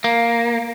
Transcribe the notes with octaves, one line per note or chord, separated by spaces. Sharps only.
A#3